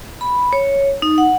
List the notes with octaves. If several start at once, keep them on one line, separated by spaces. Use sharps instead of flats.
B5
C#5
D#4
F#5